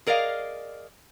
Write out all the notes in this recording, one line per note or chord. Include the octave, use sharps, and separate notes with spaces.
G#4 A#4 D5 D#5 F5